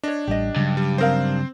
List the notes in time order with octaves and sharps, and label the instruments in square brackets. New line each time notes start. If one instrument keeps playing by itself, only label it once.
[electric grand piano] D4 [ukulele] C#5 D#5
[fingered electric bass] A1 G3 [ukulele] G4 D#5
[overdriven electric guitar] G2 [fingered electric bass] C#3 F#3
[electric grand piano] G3
[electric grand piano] C4 C5 [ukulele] D#4 A#4 F5